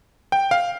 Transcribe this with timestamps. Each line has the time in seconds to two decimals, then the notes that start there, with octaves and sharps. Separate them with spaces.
0.32 G5
0.51 F5